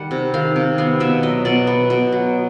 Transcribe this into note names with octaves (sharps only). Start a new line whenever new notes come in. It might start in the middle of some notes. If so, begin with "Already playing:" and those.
Already playing: D#3 G3 F#5
C3
D#3 F5
C3
B3 F5
B2 E5
F#3 D#5
B2 D5
B3
B2
F#3